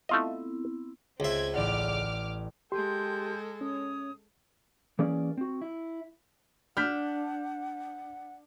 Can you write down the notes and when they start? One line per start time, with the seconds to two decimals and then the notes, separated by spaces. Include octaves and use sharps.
0.09 A3 B3 C4 E4 F4 D#5
1.20 C#2 C4 E5 G#6
1.54 A1 D5 F#5 D6 F6
2.72 G#3 G4 A4 G5 A5 C6 G6
3.61 C#4 C#5 D#6
4.99 E3 A#3 C#4 G#4 A#4 D5
5.38 C4 F#4
5.61 E4
6.77 D4 F#5 F6 G6 B6